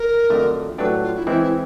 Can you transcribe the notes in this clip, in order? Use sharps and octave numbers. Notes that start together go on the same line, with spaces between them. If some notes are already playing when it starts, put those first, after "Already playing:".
Already playing: A#4
F2 D3 F#3 A3
A2 F#3 A3 D4 G4 B4
F4
E4
E3 G#3 C4 E4
E4